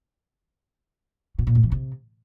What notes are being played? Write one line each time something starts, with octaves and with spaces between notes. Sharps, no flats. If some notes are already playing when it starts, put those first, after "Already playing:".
B2
A#2
A2
E3
C3